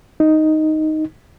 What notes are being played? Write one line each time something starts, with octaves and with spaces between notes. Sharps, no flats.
D#4